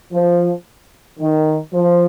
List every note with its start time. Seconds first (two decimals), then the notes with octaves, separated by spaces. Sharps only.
0.13 F3
1.19 D#3
1.73 F3